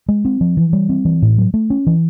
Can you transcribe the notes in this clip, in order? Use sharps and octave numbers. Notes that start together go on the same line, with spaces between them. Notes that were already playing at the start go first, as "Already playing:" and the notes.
G#3
C4
F3
E3
G3
C4
E3
A2
F#3
A3
C#4
E3